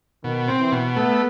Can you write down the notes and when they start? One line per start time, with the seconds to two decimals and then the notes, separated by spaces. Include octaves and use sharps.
0.24 B2 D#3
0.48 C4
0.60 E3
0.72 B2
0.96 A3 B3